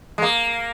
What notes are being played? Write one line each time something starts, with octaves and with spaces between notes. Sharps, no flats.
G#3
A#3